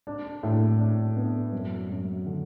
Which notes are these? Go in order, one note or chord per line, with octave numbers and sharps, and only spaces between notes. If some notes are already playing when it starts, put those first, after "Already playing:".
D4
A2
D4
B3
F#2
F#2
D3